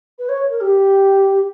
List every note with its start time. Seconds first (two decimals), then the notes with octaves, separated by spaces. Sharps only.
0.18 B4
0.28 C#5
0.50 A#4
0.60 G4